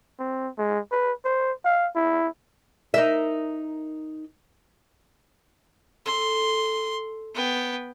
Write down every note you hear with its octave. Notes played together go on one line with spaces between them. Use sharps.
C4
G#3
B4
C5
F5
E4
D#4 A#4 E5
A4 C6
B3 G5